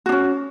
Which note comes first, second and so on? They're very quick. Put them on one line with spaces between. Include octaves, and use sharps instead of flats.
F#4 D4 C#4